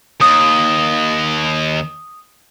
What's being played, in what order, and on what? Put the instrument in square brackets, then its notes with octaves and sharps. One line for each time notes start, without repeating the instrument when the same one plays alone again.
[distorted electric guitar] D#2 [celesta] D#6